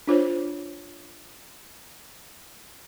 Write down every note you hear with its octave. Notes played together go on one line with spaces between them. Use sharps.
D4 F4 C5 C#5